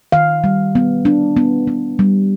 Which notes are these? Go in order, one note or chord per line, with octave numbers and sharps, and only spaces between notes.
D#3 F5
G3
B3
D4
B3
B3
G3